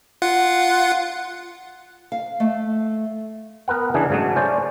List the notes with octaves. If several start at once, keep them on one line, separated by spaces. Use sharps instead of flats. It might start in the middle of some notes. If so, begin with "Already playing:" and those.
F4 F#5
F5
A3
B3 A#4 B4 F#5
C#3 E3 D4 G#4
G#2 C#3 F#3 A3
C#4 C5 D5